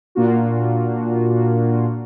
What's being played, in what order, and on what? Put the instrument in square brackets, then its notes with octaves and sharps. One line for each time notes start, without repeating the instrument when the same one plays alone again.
[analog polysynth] A#2 A#3 D4 F4 F#4